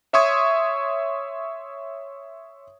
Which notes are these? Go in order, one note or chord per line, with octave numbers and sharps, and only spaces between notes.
C#5 E5 C6 C#6 D#6 G#6